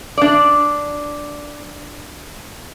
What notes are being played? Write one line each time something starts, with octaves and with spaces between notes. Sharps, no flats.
D4 D5